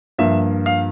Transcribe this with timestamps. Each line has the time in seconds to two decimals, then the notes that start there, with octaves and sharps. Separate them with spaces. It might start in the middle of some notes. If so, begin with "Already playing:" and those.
0.18 G2 F3 A#3 E5
0.66 F5